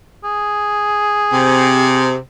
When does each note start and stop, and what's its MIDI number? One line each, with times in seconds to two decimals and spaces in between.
0.24 2.14 68
1.33 2.16 48